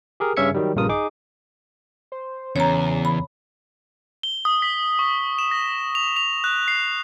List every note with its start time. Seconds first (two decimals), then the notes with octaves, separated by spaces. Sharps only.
0.20 G4 G#4 A#4
0.37 G2 C#3 C#4 E5 G#6 C#7
0.54 D#3 F#3 G3
0.76 A#1 G2 C#3 F4 A#4 D#6
0.89 D#4 G#4 D6
2.12 C5
2.56 E2 C#3 C#5 A#5
3.05 B5
4.23 G7
4.45 D#6
4.62 B6
4.99 C#6
5.39 E7
5.51 A#6
5.95 F7
6.16 F7
6.44 F#6
6.68 C7